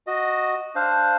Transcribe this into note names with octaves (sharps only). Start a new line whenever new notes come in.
F#4 D#5
D4 C5 F5